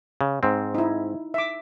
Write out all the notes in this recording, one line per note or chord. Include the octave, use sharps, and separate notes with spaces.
C#3
G#2 C4
D#4 E4
E5 D6